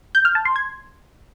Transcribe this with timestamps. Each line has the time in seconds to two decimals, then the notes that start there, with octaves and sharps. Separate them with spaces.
0.15 G6
0.25 F6
0.35 A5
0.45 C6
0.56 G#6